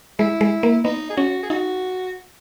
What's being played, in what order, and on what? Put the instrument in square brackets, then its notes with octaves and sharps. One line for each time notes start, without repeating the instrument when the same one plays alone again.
[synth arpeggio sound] G#3 [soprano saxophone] E4
[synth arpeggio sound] G#3
A#3
[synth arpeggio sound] B3 [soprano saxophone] D#4
[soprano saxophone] G#4
[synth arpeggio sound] C#4 [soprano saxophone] F#4
[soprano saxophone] G#4
[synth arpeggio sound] D#4 [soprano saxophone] F#4